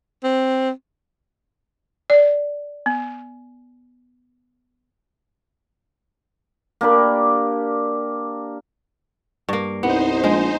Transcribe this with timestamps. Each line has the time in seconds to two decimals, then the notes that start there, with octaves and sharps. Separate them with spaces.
0.23 C4
2.10 D5
2.86 B3
6.81 A#3 D4 G4 B5
9.49 G2 A#3
9.83 C2 B3 D#4 C5
10.24 A#1 G#3